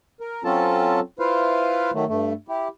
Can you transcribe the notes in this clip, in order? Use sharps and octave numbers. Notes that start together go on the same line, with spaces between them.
A#4
F#3 C4 C#4 F4 A4 A5
E4 F4 B4 C5 F5
D#3 F#3 A3
G2 A3
E4 G4